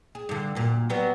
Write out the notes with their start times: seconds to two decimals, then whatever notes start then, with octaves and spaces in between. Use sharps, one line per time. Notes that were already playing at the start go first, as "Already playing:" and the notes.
0.15 G#4
0.29 G2 D3
0.55 F#2 A#2
0.90 F#3 G3 B3